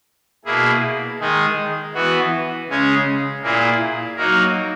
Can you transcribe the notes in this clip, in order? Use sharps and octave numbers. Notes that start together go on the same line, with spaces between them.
B2 A#3 E4 G#4
D#3 G#3 D#4 G#4
E3 B3 F#4
C#3 G#3 C#4 G#4
A#2 A#3 E4 G#4
F#3 A#3 D#4 F#4 A#4